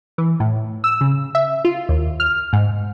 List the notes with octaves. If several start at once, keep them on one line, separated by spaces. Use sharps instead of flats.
E3
A2
E6
C#3
E5
F4
D#2
F6
G#2